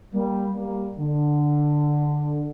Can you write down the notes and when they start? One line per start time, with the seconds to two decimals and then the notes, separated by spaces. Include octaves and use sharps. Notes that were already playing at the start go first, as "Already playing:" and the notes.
0.14 G3 A#3
0.56 G3 A#3
0.98 D3